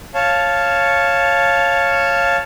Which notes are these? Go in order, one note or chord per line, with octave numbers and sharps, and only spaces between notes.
C#5 F5 A5